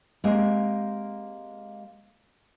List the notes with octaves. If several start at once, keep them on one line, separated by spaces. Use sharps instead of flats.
G#3 A#3 C4 G4 G#5